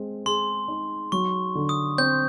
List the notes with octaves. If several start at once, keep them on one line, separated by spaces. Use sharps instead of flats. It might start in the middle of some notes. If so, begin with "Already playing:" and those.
Already playing: G#3 C4
G#4 C6
D#4
F#3 C#6
D3
D#6
C4 G6